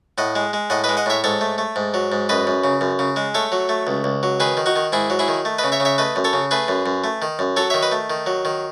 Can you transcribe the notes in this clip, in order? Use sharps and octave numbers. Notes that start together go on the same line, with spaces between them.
A2 D#5 F#5
G#3
G#3
A2 D#5 F#5
B4 D#5
G#3
D#5 F#5
A2 C#5 E5
G#2 A4 C#5
A3
A3
G#2
F#3
G#2
F#2 B4 D#5
F#2
C#3
F#2
C#3
G#3
A3 A4 C#5
F#3
A3
C#2
C#2
F#3
D#3 G#4 B4
D#3
D#4 F#4
D#3
G#2 E4 G#4
F#3
E4 G#4
D#3
A3
B4 D#5
C#3
C#5 E5
C#3
C#5 E5
A3 B4 D#5
F#2
A4 C#5
C#3
A3 G#4 B4
F#2
F#2
A3
D#3
F#2
F#3 A4 C#5
D#3 C#5 E5
B4 D#5
A3
D#3
F#3
D#3